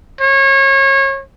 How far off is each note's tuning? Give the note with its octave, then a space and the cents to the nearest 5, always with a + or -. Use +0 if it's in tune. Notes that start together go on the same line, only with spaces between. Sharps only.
C#5 -30